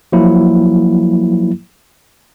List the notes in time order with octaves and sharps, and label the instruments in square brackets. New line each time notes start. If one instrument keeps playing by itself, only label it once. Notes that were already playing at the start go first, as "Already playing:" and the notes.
[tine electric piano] F3 F#3 A#3 E4